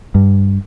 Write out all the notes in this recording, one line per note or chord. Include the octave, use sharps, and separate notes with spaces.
G2